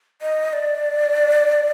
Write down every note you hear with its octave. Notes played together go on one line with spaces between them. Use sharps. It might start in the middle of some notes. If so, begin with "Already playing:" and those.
D#5
D5